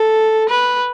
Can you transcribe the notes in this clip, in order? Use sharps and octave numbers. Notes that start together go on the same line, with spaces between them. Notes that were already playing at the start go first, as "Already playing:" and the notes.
Already playing: A4
B4